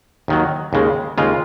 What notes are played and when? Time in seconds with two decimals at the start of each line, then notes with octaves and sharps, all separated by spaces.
0.28 D#2 D#3 F#3
0.73 D#2 C#3 G#3
1.18 D#2 C#3 G#3 F4